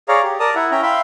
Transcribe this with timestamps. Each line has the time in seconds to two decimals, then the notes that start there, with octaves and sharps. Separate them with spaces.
0.09 G#4 C#5 D5 F5 A#5
0.23 G4
0.40 A#4 D5 A5 A#5 D#6
0.56 E4 E5 F#5
0.71 C#4 E5 G5 A#5
0.83 E5 F5 G5 B5 C6